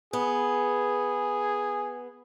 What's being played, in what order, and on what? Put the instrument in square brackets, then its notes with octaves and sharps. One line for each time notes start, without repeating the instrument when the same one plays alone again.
[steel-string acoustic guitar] B3 [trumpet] G#4